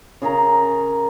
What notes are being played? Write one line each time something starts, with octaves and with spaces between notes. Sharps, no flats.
C#3 G#4 A#4 A#5